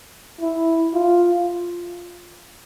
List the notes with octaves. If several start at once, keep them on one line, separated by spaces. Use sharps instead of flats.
E4
F4